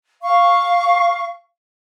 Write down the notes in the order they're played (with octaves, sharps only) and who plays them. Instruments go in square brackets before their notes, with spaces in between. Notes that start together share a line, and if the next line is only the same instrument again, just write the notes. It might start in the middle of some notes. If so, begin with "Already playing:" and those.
[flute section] F5 C#6